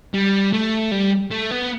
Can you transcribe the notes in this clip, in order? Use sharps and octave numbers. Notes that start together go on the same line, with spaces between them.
G3
A3
G3
A3
B3